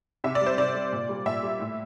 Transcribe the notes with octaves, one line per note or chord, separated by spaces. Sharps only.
C3 E5
D5
G3
C5
C3 D5
G3
A#2
G3
A#2 E5
G3
A2